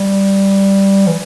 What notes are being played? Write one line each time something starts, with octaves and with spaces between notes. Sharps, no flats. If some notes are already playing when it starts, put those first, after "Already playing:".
Already playing: G3
E3